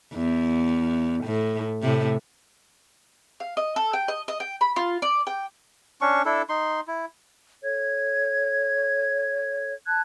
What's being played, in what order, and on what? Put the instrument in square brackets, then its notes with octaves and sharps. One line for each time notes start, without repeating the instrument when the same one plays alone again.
[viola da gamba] E2
A2
A2 C3
[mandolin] F5
D#5
A4
G5
D#5
D#5
G5
B5
F4
D5
G5
[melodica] C#4 D4 C#6
D4 E4 A4
D#4 C6
E4
[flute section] A4 C#5 G#6
A5 F#6 G#6